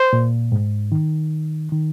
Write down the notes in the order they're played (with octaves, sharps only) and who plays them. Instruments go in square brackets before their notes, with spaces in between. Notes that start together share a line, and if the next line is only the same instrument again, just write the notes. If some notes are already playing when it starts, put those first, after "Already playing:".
Already playing: [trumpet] C5
[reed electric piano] A#2
G#2
D#3
D#3